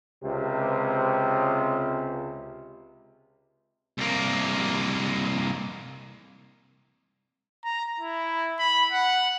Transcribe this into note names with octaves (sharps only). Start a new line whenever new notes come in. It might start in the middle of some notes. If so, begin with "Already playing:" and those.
C#2 C3
C2 A#3
A#5
E4
B5
F#5